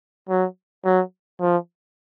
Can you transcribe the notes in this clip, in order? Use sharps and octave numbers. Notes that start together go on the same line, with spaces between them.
F#3
F#3
F3